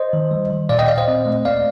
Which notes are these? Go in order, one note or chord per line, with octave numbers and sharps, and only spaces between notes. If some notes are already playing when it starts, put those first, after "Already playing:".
Already playing: C5 D#5
D#3
G3
D#3
A#2 D5 F5
D#5 G5
A#2 D5 F5
C5 D#5
C4
A3
A#3 D5 F5